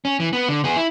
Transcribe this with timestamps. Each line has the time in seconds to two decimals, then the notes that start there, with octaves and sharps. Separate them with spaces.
0.05 C#4
0.20 E3
0.33 B3
0.49 D3
0.64 B3 G#4
0.76 E4